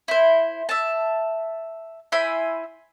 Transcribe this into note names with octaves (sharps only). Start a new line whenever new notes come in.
E4 C5
E5 A5
E4 C5 G#5 B5